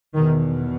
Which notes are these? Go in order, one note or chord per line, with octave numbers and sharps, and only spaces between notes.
E2 B2 D#3